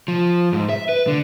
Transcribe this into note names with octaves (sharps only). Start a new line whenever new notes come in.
F3
G#2
E5
B4
D3